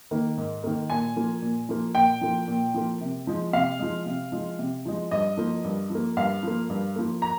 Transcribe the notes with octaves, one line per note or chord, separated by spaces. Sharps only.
D#3 A#3
G#2
D#3 A#3
A#2 G#5
F3 A#3
A#2
F3 A#3
A#2 G5
F3 A#3
A#2
F3 A#3
C3
F3 G#3
C3 F5
F3 G#3
C3
F3 G#3
C3
F3 G#3
G2 D#5
F3 A#3
G2
F3
A#3
G2 F5
F3 A#3
G2
F3 A#3
A#5